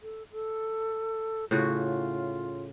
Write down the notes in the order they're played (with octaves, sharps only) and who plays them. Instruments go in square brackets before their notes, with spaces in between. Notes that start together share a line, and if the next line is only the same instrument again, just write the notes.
[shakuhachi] A4
A4
[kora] A2 C#3 F#4 [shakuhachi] F4